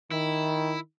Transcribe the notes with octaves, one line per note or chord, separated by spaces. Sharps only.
D#3 E4